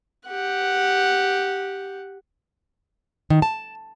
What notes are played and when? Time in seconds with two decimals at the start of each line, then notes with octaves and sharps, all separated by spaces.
0.27 G4 F#5
3.30 D#3
3.42 A5